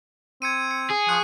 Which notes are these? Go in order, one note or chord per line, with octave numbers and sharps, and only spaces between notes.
C4 G#6 C#7 D#7
C#7
G#4
F3 C#6 F#6 D#7